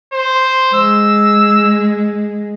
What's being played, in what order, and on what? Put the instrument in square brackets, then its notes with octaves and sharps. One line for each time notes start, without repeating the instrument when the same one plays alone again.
[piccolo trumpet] C5
[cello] G#3 [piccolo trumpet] E6